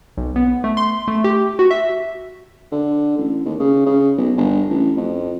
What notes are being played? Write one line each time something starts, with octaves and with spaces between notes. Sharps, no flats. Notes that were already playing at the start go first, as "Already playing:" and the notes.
B1
B3
A3
C6
A3
G4
F#4
E5
D3
A1
D#2
C#3
C#3
B1
G1
A1
F2